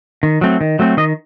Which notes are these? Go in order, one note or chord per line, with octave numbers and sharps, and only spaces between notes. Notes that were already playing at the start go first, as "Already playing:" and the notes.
D#3
F#3 A3 C4
D#3
F#3 A3 C4
D#3 D#5